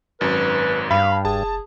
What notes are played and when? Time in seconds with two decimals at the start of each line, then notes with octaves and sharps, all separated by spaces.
0.21 G#1 F#2 B4
0.91 G2 F5 B5
1.25 F1 G#4 A5